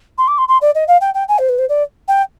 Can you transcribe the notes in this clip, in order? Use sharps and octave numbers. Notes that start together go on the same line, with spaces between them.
C6
D6
C6
C6
D5
D#5
F5
G5
G5
G#5
C5
B4
C5
D5
G5